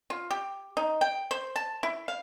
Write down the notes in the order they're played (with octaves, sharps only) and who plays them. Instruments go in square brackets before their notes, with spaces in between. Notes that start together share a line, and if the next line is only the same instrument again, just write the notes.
[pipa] F4
G4
D#4
G5
C5
A5
E4
F5